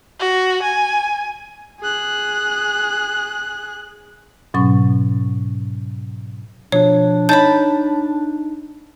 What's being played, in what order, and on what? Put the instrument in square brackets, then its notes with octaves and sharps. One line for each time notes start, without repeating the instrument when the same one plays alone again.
[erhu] F#4
G#5
[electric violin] G#4 F#6
[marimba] G#2 B2 F#3 C#4 C#6
[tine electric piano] B2 F3 [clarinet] D4 [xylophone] C#5
[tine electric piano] D#4 [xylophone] C#5 G6 [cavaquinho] A5 B5